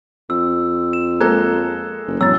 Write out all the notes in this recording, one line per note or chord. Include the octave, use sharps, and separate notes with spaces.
F2 E6
E7
G#3 A#3 A4 A#5 F#6 G#6
F#1
E1 F#2 A2 E6 A6